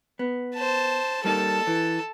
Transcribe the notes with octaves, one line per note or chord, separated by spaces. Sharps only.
B3
C5 A5
G3 A#3 D#4 A4 A5
E3